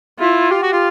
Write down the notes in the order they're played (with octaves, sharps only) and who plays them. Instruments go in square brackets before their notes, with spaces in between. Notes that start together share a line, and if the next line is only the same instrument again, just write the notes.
[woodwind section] E4 [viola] F4
[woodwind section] F4 [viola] G4
[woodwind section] F#4
F4